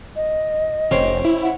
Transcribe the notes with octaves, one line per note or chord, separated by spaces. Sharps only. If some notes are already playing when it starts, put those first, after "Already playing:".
D#5
F1 C#4 C5 G5
E4
F#5